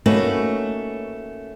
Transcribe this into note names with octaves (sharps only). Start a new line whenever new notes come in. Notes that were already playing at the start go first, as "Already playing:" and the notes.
A3 A#3 C#4 D#4 F#4 B4